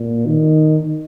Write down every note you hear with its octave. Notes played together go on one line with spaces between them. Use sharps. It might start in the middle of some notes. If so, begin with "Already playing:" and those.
Already playing: A#2
D#3